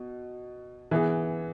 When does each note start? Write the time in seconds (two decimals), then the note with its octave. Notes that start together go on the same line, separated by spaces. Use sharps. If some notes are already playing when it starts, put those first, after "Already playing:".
Already playing: B2
0.91 E3 B3 G#4